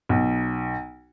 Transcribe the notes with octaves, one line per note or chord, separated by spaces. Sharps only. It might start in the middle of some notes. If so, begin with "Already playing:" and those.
B1